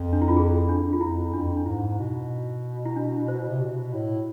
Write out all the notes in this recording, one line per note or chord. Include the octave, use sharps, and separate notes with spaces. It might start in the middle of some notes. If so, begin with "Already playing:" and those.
Already playing: F2
D4
E4
F4
G#4
D4
F4
F2 E4
F2 D4
D4
G#2 E4
B2
E4
D4
C5
C3
B2
A2